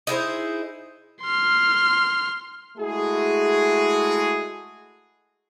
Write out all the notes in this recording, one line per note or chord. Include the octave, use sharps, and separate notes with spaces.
D#4 E4 G#4 C5
C6 F6
G#3 A3 E4 F#4 G#4